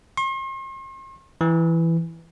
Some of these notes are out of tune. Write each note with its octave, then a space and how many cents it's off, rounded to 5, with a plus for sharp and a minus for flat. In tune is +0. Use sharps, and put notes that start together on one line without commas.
C6 +45
E3 +5